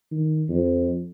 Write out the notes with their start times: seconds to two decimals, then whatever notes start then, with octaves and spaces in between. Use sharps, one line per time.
0.11 D#3
0.49 F2